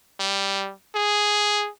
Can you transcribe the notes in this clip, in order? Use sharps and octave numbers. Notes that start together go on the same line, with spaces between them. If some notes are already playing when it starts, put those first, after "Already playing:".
G3
G#4